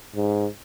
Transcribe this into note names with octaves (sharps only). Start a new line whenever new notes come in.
G#2